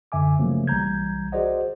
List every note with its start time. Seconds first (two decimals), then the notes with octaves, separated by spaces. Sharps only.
0.12 F#2 D3 E5 G#5 D6
0.39 C#3 F3 F#3 A3 A#3 C#4
0.67 B1 E3 G3 A#5 G6 G#6
1.32 F#4 G#4 C5 D5 D#5 F#5